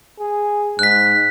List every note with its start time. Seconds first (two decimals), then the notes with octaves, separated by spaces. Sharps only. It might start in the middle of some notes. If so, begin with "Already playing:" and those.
0.19 G#4
0.79 G#2 F#6 B6